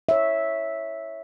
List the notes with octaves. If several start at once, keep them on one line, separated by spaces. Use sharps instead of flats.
C#5 E5